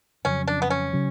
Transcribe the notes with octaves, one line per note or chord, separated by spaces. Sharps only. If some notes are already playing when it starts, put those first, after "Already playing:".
F2 C#3 F#3 C#4
D4
B3
C#4
C#3 F#3